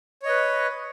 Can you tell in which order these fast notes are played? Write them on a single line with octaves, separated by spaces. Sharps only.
C#5 D#5 B4